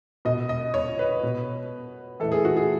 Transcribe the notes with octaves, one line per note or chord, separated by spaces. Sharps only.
B2 D#5
D#5
C#5
B4
B2
A2 E3 A4
G#4
F#4
G#4